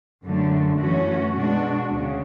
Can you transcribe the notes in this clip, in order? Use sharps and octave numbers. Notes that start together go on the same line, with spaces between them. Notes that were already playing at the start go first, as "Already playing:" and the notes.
F#2 D3 A3
F#2 E3 A3 C#4 F#4
B2 G#3 D4 F#4
D2 C#3